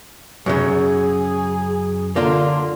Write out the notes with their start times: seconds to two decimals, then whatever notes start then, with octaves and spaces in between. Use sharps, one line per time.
0.46 F#2 A2 C#3 G#4
2.16 D3 A#3 D4 F4